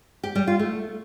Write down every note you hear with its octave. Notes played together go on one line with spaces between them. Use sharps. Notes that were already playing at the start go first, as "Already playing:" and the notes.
G4
G3
F4
A3